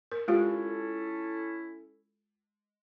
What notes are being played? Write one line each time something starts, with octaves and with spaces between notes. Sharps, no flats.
A#4
G#3 C#4 E4 F4 G4 A4